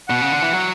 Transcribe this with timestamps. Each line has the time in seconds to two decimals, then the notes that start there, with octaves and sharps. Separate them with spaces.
0.08 B2 F#5
0.21 C#3
0.32 D3
0.42 E3
0.53 F#3